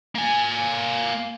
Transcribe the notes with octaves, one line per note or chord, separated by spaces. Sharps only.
A#3 G#5